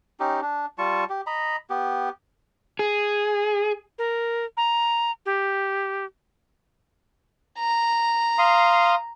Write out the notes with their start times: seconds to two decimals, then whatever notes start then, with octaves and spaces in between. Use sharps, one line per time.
0.20 C#4 D#4 G4
0.42 D4
0.78 G3 F4 A5 C#6
1.09 G4
1.27 D#5 A#5 B5
1.70 B3 G4
2.79 G#4
3.98 A#4
4.57 A#5
5.26 G4
7.58 A#5
8.39 F5 C6 D#6